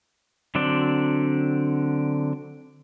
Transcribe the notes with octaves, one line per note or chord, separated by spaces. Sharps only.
D3 F#3 C4 D4 D5